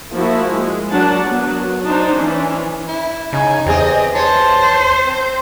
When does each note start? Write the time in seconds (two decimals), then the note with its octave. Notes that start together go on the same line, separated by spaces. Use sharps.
0.13 F3 A#3 E4 F#4
0.46 G#3
0.91 F#3 D4 A#4 F#5 A5
1.23 F#3 B3 F#4
1.86 D4 D#4 C5
2.17 E3 C#4 D4
2.88 E4
3.33 C#3 D#4 G#5
3.66 E2 C4 G4 G#4 D#5
4.15 C5 C#5 A5
5.07 C4